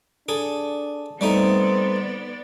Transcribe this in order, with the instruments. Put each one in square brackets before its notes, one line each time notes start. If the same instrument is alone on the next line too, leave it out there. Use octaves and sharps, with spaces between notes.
[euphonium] D4 [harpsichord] G#4 A4
[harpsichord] G3 A3 D#4 [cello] B3 D5 [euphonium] C4